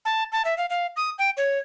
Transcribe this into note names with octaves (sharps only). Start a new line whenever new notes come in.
A5
A5
E5
F5
F5
D#6
G5
C#5